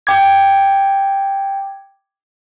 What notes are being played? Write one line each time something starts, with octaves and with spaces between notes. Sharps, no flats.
G5 D6 G#6